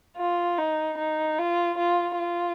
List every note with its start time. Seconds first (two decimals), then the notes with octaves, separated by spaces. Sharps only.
0.17 F4
0.58 D#4
0.99 D#4
1.39 F4
1.78 F4
2.19 F4